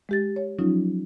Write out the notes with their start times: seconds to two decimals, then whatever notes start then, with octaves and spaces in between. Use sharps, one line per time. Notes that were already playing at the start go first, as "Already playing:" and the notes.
0.09 G#3 G4 A6
0.36 C#5
0.59 F3 F#3 C#4 D#4 F4